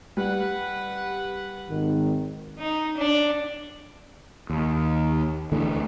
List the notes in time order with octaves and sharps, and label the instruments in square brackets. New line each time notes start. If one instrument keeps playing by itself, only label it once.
[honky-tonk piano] G3 [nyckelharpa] B4 F#5
[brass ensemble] G#1 D#3
[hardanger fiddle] D#4
D4
[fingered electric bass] D#2
D2 D3 E3 A3